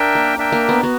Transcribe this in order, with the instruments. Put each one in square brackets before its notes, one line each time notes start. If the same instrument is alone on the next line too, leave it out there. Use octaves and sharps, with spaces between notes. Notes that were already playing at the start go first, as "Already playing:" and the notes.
Already playing: [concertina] D4 A#4 E5 G5
[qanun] A#3
[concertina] D4 A#4 E5 G5
[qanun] A#3
B3
[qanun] B3 [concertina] F#4